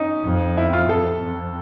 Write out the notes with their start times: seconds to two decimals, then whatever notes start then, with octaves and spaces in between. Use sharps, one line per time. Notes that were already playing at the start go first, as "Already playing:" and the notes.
Already playing: C#4 D#4
0.24 F2
0.57 E4
0.73 F4
0.89 F2 A4
1.22 F2